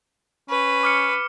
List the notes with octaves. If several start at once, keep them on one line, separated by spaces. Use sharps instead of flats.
C#4 B4
D6 F6 C#7